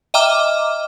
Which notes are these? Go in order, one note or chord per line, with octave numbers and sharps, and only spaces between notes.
D#5 E5 G5 A#5 D6 F6